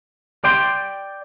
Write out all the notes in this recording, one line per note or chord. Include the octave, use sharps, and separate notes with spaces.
D5 G5 C6